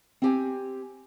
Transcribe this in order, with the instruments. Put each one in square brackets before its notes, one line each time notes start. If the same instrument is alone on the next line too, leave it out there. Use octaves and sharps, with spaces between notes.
[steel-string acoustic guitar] C4 G4 G#5